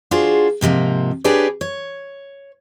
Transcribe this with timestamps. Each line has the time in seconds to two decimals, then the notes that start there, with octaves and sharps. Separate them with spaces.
0.11 D4 F4 F#4 G#4 C5
0.61 G#2 C3 F3 A#3
1.24 D4 G4 G#4 B4 C#5 D5
1.61 C#5